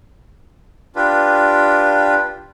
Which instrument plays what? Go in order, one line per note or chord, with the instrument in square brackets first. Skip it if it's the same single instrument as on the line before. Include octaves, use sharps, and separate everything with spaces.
[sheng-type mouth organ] D4 F4 G4 B4